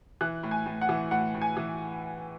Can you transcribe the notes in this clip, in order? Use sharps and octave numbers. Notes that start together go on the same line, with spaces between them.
E3 F#6
A2
G#5
A2
F#5
E3
A2 F#5
A2
G#5
E3